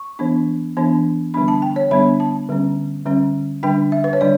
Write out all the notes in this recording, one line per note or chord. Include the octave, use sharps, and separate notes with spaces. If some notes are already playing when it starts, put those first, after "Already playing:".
Already playing: C#6
E3 B3 D4
E3 B3 D4
D3 G3 B3 D4 B5
A5
G5
C#5
D3 G3 B3 D4 B5
A5
D3 G3 C#4
D3 G3 C#4
D3 G3 D4 G5
E5
B4
C#5
D3 G3 D4 D5